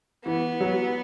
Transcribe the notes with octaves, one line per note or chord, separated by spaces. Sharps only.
E3 B3
F#3